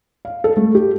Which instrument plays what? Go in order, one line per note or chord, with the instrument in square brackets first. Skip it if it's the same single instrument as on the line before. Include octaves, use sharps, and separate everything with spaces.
[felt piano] F5
A4
A3
G4